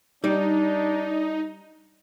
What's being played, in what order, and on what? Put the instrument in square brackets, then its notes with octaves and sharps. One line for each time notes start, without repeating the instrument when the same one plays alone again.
[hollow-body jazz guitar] G3 [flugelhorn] D4 [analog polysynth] D#4